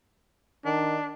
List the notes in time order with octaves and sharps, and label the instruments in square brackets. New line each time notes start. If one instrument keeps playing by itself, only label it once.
[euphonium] D#3 [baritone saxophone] D4